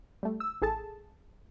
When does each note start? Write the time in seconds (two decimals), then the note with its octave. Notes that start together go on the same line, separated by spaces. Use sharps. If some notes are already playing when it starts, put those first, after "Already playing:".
0.23 G3 A3
0.40 E6
0.62 A1 G#4 A4 A5